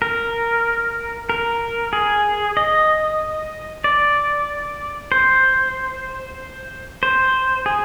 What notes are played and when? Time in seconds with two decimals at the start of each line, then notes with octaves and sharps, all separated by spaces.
0.02 A#4
1.29 A#4
1.93 G#4
2.57 D#5
3.84 D5
5.12 C5
7.03 C5
7.66 G#4